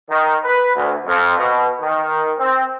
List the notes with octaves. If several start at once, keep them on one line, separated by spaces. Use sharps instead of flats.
D#3
B4
D2
F2
B2
D#3
C4